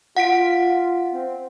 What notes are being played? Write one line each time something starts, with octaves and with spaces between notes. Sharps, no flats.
F4 F#5 B6 D7
C4